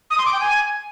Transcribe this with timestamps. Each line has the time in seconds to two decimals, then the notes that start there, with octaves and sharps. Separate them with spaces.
0.10 D#6
0.18 C6
0.25 D6
0.33 G5
0.40 G#5